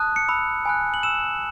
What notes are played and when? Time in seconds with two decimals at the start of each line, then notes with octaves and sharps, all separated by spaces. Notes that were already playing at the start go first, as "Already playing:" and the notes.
Already playing: A5 D#6 F#6
0.16 C#7
0.28 B5 E6
0.65 G#5 B5 F#6
0.94 F#7
1.03 B5 E6 E7